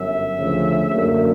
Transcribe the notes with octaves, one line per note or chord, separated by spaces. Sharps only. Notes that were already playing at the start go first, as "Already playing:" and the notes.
Already playing: G1 F#2 F#3 E5
D2 C#3 F3
F#2 D3 F#3 A#3